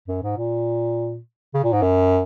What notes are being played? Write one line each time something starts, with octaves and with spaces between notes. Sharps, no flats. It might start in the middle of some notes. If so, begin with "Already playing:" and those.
F#2
G#2
A#2
C#3
A#2
G#2
F#2